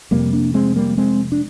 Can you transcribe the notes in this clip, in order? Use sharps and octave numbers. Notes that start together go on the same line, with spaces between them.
F1 F2 C3 G3 A#3
A#3 D4
G#3 C4
G3 A#3
G#3 C4
D4